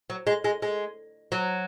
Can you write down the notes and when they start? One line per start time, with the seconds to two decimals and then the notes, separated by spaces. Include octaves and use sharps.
0.10 F#3
0.27 G#3
0.44 G#3
0.62 G#3
1.32 F#3